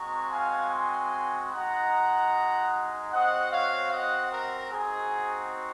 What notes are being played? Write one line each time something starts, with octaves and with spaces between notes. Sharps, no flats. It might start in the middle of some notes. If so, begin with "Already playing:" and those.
Already playing: G#3 C4 F#4 A#5 C#6
F5 G#5
G#5 C6
G#3 D#4 F#4 F#5 A#5
C4 F#4 D#5 F#5
C#5 F5
D#5 F#5
A#4
C4 D#4 F#4 G#4